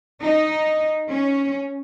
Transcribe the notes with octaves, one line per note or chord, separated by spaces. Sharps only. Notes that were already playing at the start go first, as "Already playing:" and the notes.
D#4
C#4